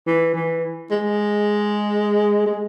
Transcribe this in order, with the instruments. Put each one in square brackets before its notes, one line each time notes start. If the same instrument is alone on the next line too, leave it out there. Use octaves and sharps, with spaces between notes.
[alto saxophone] E3
E3
G#3
G#3